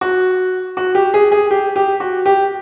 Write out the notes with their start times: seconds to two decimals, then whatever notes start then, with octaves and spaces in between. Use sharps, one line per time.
0.01 F#4
0.77 F#4
0.95 G4
1.14 G#4
1.32 G#4
1.51 G4
1.76 G4
2.00 F#4
2.26 G4